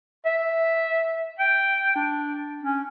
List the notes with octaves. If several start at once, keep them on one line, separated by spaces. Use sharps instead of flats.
E5
G5
D4
C#4